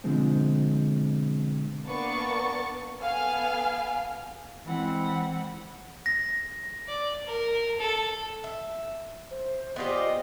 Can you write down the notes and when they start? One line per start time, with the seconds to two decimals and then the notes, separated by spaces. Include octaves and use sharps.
0.04 B2 D3 F3 G#3 C4
1.85 A#3 B3 D4 C#6 A6
3.00 B3 A4 F5 G#5 F6
4.65 E3 G#3 C4 F#5 B5
6.06 A#6
6.88 D5
7.26 A#4
7.78 A4
8.44 E5
9.31 C5
9.76 B3 F4 G4 G#4 D5 D#5